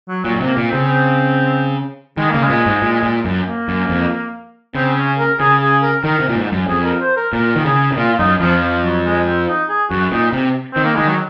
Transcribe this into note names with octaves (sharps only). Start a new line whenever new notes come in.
F#3
A#2 F#3
A#2
C3 A#3
A#2
C4
C#3
C4
D#3 G#3
C#3 A#3
G#3
A#2
G#2
A#2
A#2
F#2
A#3
F#2
F2
C#3 C4
C#4
A#4
C#3 G#4
G#4
A#4
D#3 A#4
C3
A#2
G#2
F#2
F2 G#4
A#4
C5
A#4
A#2 A#4
D#3
C#3 G#4
C3
A#2 F4
F4
F#2 D#4
F2 F3
F3
F#3
G#3
C4
D#4
G#4
F#2 F#4
A#2 D#4
C3
D#3 C4
A#3
D#3 G#3
F#3